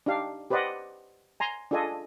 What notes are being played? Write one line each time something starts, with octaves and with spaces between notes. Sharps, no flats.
D4 D#4 G4 F5
G4 B4 C5 D5 D#5 F#5
G#5 A#5 C6
D4 F4 G#4 A4 D#5 G#5